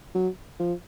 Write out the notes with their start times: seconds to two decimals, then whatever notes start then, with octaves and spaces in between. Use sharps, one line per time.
0.15 F#3
0.60 F3